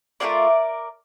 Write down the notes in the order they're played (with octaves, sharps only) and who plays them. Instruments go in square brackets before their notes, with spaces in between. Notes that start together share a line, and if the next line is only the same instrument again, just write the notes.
[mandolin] A3 D4 F4 A#4 D5